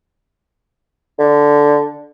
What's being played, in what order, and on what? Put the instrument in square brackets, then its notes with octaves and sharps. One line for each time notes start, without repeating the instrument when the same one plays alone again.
[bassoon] D3